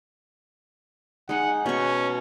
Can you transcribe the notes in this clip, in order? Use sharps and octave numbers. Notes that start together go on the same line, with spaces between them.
G#3 D#4 F#5
B2 C#4 C#6